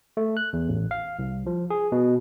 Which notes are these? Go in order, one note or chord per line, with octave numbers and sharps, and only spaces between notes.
A3
F#6
E2
A1
F5
C2
F3
G#4
B2